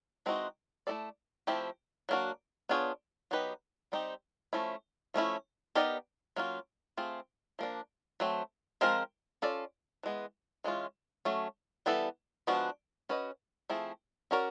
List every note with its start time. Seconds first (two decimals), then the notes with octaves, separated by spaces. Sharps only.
0.26 E3 G#3 C4 D#4 F#4
0.87 A3 C#4 E4 A4 D5
1.47 F3 A3 C4 E4 G4
2.09 F#3 A#3 D4 F#4
2.69 B3 D4 F4 G#4 C#5
3.31 F#3 B3 D#4 G4 B4
3.92 G3 C4 D#4 G4
4.53 F3 A3 C#4 E4
5.14 F3 A3 C#4 E4
5.75 B3 D#4 G4 A#4 D5
6.36 F#3 A#3 C#4 F4
6.97 A3 C4 F4 G#4
7.59 F3 A#3 D4
8.20 F#3 A3 C4
8.81 F3 G#3 C4 F4 A#4
9.42 C#4 F4 A4 D5
10.03 E3 G#3 B3
10.64 E3 G#3 C#4 F4
11.25 F#3 A3 C#4
11.86 E3 G3 B3 E4 A4
12.47 F3 G#3 B3 D4 F#4
13.09 C#4 F#4 B4 D#5
13.70 F3 A3 C4 E4 G#4
14.31 C#4 F#4 A#4 D5